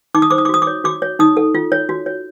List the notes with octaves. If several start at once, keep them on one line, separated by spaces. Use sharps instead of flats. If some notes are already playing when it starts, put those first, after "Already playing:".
D#4 D6
D#6
C5 D6
D#6
D6
F#4 D#6
D6
C#5
F#4 D6
C#5
D#4 D#6
A4
F4
C#5
F#4
C#5